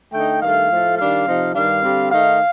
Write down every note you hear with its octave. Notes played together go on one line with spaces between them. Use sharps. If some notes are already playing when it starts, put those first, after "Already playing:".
D3 A3 D#4 G5
G2 D#3 A3 F5
A2 F3 A3
D#3 G3 D4 F5
C3 F3 C4 D#4
G2 D#3 G3 D4 F5
D3 G3 C4
D#3 A3 D#4 F5